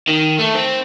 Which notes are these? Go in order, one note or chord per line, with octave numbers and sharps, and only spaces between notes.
D#3
A3
C4